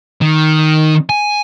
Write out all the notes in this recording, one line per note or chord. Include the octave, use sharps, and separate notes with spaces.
D#3
G#5